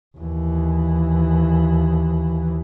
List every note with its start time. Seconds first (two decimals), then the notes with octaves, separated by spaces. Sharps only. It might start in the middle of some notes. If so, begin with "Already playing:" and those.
0.18 D#2 E3